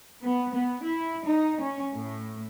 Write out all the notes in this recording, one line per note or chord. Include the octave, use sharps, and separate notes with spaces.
B3
B3
E4
D#4
C#4
A2